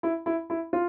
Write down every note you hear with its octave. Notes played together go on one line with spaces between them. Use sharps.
E4
E4
E4
F4